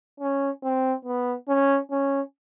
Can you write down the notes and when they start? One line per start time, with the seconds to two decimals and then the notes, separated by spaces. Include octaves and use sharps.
0.20 C#4
0.63 C4
1.05 B3
1.48 C#4
1.91 C#4